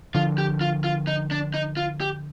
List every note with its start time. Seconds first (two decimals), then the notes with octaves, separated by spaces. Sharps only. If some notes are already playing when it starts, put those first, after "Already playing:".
0.14 D3 F3 F4
0.38 G4
0.61 F4
0.84 F4
1.07 D#4
1.31 D4
1.54 D#4
1.77 F4
2.01 G4